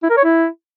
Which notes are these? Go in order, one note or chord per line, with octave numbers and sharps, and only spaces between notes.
E4
A#4
C#5
E4